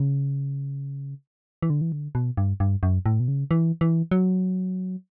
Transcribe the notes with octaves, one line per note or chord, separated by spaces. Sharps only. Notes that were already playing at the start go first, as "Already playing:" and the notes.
Already playing: C#3
E3
D3
E3
D3
B2
G2
G2
F#2
A2
B2
C#3
E3
E3
F#3